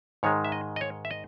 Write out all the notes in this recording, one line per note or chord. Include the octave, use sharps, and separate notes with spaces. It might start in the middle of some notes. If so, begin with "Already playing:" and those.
G#2 D#3 G#3 C#5
E5
D#5
D#5
C#5
E5
D#5